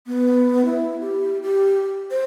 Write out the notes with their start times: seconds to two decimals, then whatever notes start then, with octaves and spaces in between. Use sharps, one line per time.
0.07 B3
0.65 E4
1.01 G4
1.43 G4
2.11 C5